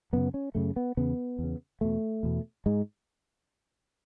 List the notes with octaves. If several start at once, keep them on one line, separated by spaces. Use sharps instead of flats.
F#2 C#3 B3
C#4
F#2 C#3 A3
B3
E2 C#3 B3
E2 C#3
E2 B2 A3
E2 B2
G#2 G#3